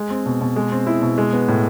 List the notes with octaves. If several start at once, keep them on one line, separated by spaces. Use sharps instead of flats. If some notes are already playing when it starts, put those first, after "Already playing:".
Already playing: G#3
C4
B2
B2
G#3
C4
E4
B2
G#3
B3
A2